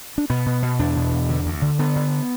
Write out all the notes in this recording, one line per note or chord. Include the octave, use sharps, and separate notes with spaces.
D4
B2 B3
B2
B2
E2 D4
B2
E2
D3
D2
D3
D3 B3
D3